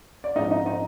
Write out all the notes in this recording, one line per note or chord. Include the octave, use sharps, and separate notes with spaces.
D5
G#2 F3 G#3 C4 D#4 D#5
D#4 D#5
D#4 D#5